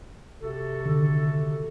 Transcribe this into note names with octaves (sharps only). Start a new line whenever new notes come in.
C3 F#4 A4
D3 D#3